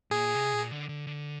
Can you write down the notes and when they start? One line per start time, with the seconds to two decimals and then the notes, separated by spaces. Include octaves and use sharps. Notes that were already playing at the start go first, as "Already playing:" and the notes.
0.11 A#2 G#4
0.35 C3
0.53 A#2
0.71 D3
0.89 D3
1.07 D3